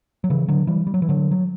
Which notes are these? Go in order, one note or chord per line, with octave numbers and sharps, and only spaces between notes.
F#3
C#3 E3
D3 F#3
E3 G3
G3
F#3
E3
D3 F#3
F#3